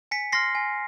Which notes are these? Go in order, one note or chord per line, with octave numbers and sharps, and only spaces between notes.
G#5 B6 C#7
C6 F6 A#6 C7
G#5